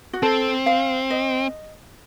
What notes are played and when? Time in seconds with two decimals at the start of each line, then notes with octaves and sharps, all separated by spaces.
0.13 F#4
0.22 C4 A4
0.66 F5
1.10 D#5